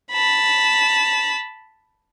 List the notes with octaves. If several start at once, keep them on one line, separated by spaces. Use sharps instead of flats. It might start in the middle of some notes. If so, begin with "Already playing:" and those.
A5 B5